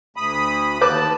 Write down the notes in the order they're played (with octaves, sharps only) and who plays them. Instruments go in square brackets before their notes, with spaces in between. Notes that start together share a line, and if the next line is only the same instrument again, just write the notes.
[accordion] D2 B5 D#6
[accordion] D#2 A5 [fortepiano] B4 D6